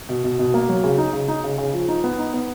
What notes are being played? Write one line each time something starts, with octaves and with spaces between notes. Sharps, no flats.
B2
B2
B2
A#3
F#3
C#3
D#4
C#3
D#4
C#3
C#3
F3
D#4
B3
D#4
B3